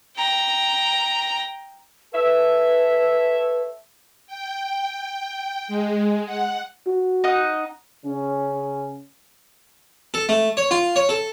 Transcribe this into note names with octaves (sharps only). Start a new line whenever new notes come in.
G5 A#5
A4 B4 C#5 E5
G5
G#3
F#5
F#4
D#4 D#5 F#5
C#3 C#4
A4
A3
C#5
F4
C#5
A4